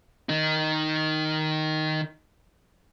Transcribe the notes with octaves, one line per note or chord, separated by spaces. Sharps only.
D#3 D#4